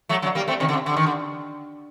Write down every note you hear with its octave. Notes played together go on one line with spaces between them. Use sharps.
F#3 A3
D3 F#3
G3 A#3
A3 C4
C3 D#3
D3
C3
D3
D#3
D3